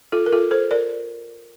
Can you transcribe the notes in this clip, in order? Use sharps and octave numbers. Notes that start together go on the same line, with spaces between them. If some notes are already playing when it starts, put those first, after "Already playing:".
F4 A4
A#4
F4 A4
A4 C5
A#4 D5